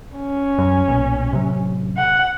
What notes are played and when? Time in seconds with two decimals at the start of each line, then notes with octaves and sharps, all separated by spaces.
0.16 C#4
0.58 F#2
0.88 B1 A#2
1.31 A1 C3 F#3
1.97 F#5